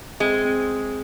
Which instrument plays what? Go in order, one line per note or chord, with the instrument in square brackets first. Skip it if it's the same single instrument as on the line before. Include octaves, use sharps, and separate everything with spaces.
[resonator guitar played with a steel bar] G#3 [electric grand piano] C4
[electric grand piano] C4